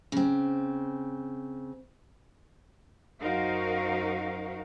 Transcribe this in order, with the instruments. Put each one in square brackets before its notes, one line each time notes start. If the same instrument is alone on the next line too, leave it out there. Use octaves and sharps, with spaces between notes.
[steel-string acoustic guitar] C#3 C4
[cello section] F#2 D#4 F#4 A#4 C5 F5